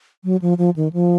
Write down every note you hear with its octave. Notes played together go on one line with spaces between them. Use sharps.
F#3
F3
F3
D#3
F3